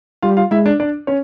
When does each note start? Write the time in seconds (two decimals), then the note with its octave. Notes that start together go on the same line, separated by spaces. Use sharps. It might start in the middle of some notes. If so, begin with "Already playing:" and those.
0.22 G3 F4 F5
0.37 F4 F5
0.51 G#3 E4 E5
0.66 D4 D5
0.80 D4 D5
1.07 C#4 C#5